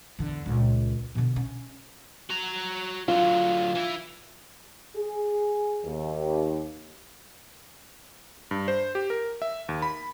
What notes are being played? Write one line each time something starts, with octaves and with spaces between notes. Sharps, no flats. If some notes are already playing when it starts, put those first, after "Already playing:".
E2 D3
C#2 A#2
B2 D3
C#4
F#4 A#5
D3 F#3 F4
E3 E4
G#4
D#2
G2
C5
G4
A#4
E5
D#2
B5